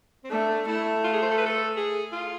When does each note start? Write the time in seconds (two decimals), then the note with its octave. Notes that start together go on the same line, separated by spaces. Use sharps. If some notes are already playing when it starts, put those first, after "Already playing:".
0.24 C4
0.31 A3 D4
0.67 A3 E4
1.04 F4
1.13 G#4
1.22 C5
1.31 A4
1.38 B4
1.46 A4
1.76 G#4
2.12 F4